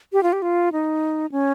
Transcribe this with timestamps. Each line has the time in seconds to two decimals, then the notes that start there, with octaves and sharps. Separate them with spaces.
0.13 G4
0.23 F4
0.33 G4
0.42 F4
0.72 D#4
1.32 C#4